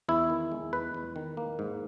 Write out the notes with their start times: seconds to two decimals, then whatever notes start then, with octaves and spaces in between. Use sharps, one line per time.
0.09 E2 E4
0.30 D#3
0.52 G#3
0.73 E2 B4
0.94 E2
1.16 D#3
1.37 A#3
1.59 G#2